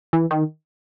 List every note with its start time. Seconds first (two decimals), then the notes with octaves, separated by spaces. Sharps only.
0.13 E3
0.31 D#3